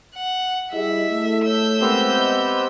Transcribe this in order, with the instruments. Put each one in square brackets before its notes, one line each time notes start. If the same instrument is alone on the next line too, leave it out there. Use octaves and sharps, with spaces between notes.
[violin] F#5
[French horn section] G3 G#4 D#5 [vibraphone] E4 [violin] E5
[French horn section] A3
[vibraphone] C#5 [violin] E6 G6
[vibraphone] G#3 A#4 C5 [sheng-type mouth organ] B3 C4 G4
[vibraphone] D#5 B5